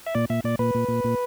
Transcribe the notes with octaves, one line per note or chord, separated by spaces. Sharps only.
E5
A#2 D5
A#2 E5
A#2 D5
A#2 B4
A#2
A#2
A#2